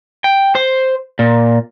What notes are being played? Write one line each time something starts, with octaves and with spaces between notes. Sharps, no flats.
G5
C5
A#2